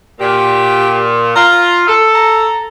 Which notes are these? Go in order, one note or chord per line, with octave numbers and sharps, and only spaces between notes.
A#2 G4
F4 A#5
A4
A#5